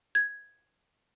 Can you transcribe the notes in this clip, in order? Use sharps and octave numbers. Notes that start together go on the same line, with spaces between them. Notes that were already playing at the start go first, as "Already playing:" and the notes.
G#6